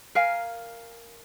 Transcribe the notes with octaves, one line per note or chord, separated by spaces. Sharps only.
A#4 F5 G#5